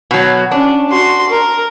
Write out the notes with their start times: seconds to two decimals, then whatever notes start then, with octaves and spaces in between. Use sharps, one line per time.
0.11 B2 F#3
0.52 C#4 D4
0.89 F#4 C6
1.29 A#4